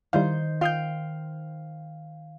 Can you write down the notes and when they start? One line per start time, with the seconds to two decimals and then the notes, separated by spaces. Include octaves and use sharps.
0.13 D#3 G3 E4 C5 F5 G6
0.61 F4 F5 G5 D#6 G6